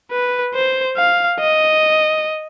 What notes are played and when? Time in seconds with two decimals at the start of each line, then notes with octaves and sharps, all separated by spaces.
0.11 B4
0.54 C5
0.97 F5
1.40 D#5